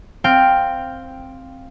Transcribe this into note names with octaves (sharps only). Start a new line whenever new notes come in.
C4 F5 G5